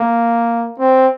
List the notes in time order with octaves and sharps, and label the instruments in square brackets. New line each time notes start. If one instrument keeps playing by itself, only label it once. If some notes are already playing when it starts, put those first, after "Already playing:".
Already playing: [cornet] A#3
C4